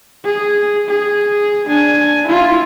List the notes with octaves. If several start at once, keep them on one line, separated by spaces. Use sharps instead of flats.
G#4
G#4
D4 G#5
E4 F4